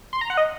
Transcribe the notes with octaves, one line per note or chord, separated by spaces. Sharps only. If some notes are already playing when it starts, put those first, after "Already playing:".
C6
A#5
F#5
D#5